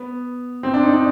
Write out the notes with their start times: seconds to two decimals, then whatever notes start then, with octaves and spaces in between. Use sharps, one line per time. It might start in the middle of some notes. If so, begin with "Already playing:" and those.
Already playing: B3
0.63 C4
0.74 D4
0.83 D#4
0.93 D4